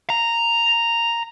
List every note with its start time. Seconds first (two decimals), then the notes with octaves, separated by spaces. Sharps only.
0.10 A#5